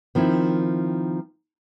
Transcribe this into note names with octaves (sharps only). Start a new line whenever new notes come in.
D#3 F3 C4 E4